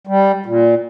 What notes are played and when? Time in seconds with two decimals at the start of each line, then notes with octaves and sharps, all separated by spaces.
0.07 G3
0.46 A#2